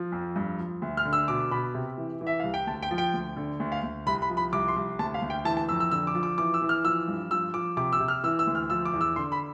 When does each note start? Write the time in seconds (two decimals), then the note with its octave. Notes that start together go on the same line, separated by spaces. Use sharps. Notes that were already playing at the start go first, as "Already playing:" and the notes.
Already playing: F3
0.12 F2
0.36 G2
0.59 F3
0.82 D2
0.97 F6
1.05 D3
1.13 E6
1.28 B2 D6
1.51 B2 B5
1.74 C3
1.97 E3
2.21 E3
2.27 E5
2.40 C2 F5
2.54 G5
2.67 D2 A5
2.83 G5
2.91 F3
2.98 G5
3.14 D2
3.37 D3
3.60 D2
3.72 F5
3.83 D2
4.06 C2 B5
4.22 B5
4.29 F3
4.37 B5
4.52 C2 D6
4.68 C6
4.76 C2
4.99 D2 A5
5.14 F5
5.22 D2
5.30 G5
5.45 E3 A5
5.57 A5
5.69 F2 E6
5.80 E6
5.91 D3 E6
6.07 D6
6.15 F3
6.23 D6
6.38 E3 D6
6.54 E6
6.62 E3
6.69 F6
6.84 F3 E6
7.08 G2
7.31 F3 E6
7.54 F3 D6
7.77 C3 D6
7.93 E6
8.00 C3
8.08 F6
8.24 E3 E6
8.39 E6
8.47 D2
8.55 F6
8.70 F3 E6
8.85 D6
8.93 E2
9.01 E6
9.16 D3 C6
9.32 B5